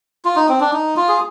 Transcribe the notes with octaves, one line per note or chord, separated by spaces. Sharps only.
F4
D#4
C4
D4
D#4
F4
G#4